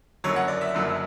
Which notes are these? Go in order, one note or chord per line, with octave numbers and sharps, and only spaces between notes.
F#1 F#2 D3 F#3 C#5
F#5
D5
E5
F#1 F#2 D3 F#3